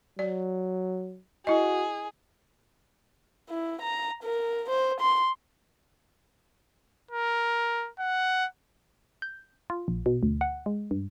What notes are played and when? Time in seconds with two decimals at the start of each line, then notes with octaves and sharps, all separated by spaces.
0.19 F#3 D5
1.47 E4 F#4 G#4 D#5
3.50 E4
3.82 A#5
4.23 A#4
4.70 C5
5.01 C6
7.11 A#4
7.99 F#5
9.22 G6
9.70 F4
9.88 A#1
10.06 B2
10.23 D2
10.41 F#5
10.66 G#3
10.91 G2